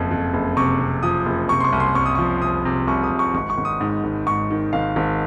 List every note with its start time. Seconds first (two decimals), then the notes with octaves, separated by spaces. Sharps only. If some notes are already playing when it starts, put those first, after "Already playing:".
Already playing: F#1 F2
0.11 F2
0.33 F#1
0.57 C3 C#6
0.80 C3
1.03 F3 D#6
1.26 F#1
1.49 C3 C#6
1.60 C6
1.64 C#6
1.72 C2
1.80 C6
1.95 C2 C#6
2.06 D#6
2.15 F3 C#6
2.42 C2 D#6
2.65 C3
2.87 C2 C#6
3.03 D#6
3.11 C2
3.19 C#6
3.34 G#1 C#6
3.50 C#6
3.58 G#1
3.65 D#6
3.81 G#2
4.04 G#1
4.27 G#2 C#6
4.50 D#3
4.73 G#1 F5
4.96 G#1